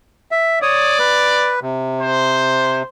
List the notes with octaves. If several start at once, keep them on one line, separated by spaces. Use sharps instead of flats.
E5
C#5 D5 D#6
B4
C3
C5